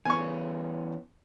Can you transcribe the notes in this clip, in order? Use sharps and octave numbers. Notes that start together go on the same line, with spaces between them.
E3 B3 C#4 G#5 C#6